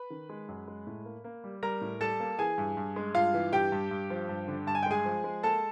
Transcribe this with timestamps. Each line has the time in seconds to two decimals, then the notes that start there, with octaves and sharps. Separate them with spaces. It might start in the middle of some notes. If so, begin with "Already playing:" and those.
Already playing: B4 B5
0.10 D#3
0.29 G#3
0.48 F#2
0.68 G#3
0.87 A2
1.05 A#3
1.24 A#3
1.44 G3
1.63 G3 A#4 A#5
1.81 A2
2.01 G3 A4 A5
2.20 A#3
2.39 E3 G#4 G#5
2.58 G2
2.77 G2
2.96 G#3
3.15 G2 F4 F5
3.34 E3
3.53 G2 G4 G5
3.72 G2
3.91 G2
4.10 F3
4.29 G2
4.48 D3
4.67 G2 A5
4.75 G#5
4.83 G5
4.86 G#3 G#4 G#5
5.05 F3
5.24 G#3
5.43 A#3 A4 A5